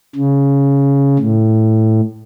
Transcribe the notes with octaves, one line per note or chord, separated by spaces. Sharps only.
C#3
A2